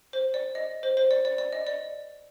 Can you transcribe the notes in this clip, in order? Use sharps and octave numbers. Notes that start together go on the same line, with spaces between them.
C5
D5
D#5
C5
C5
D5
D5
D5
D#5
D5